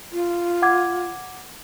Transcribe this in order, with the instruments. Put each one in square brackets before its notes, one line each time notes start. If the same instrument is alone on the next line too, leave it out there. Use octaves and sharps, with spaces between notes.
[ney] F4
[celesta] F#5 D6 G#6